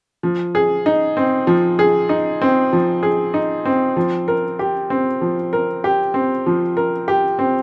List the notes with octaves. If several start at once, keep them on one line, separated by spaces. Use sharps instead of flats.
F3
G#4
D#4
C4
F3
G#4
D#4
C4
F3
G#4
D#4
C4
F3
A#4
G4
C4
F3
A#4
G4
C4
F3
A#4
G4
C4